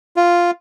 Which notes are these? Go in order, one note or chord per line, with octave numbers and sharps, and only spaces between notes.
F4